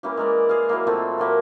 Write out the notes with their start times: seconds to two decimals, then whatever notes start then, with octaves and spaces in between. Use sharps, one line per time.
0.03 E3 A#3 C#4 G4
0.17 G#3 A#4 D5
0.49 G#4 F5
0.69 E3 F#3 A#3
0.87 A#2 A3 C4 F4
1.18 A#2 F#3 A#3 B5